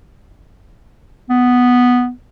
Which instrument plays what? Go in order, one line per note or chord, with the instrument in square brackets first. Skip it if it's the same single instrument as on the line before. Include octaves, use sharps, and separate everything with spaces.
[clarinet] B3